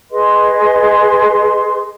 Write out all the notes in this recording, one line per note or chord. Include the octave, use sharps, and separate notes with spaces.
G#4 B4 D#5 C6